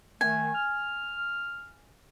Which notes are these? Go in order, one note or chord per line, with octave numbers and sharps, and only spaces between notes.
D#3 A3 G#5
F6